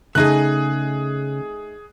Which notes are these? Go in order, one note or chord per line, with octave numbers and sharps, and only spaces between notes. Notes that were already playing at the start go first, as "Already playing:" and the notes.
C#3 A3 D#4 G#4 G#5 F#6